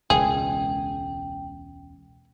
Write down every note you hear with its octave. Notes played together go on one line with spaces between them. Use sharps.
E1 C#2 E3 G#4 G5